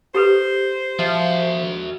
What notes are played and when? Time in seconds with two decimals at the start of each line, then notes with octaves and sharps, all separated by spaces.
0.14 G4 A4 B4 C5
0.99 F3 F#4 E5